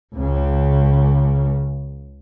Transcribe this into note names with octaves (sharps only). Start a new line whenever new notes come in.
C#2 C#3